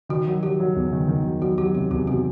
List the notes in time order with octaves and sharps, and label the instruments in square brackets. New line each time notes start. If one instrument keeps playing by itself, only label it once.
[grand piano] D#3 [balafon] F#4
[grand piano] F#3
[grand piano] F#3 [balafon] G4
[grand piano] F#3
E2
D#3
D#3
F#3
[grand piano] F#3 [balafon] F#4
[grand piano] F#3 [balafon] G4
[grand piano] C3 [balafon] G4
[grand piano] E2 [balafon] G4
[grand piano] C3 [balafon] F#4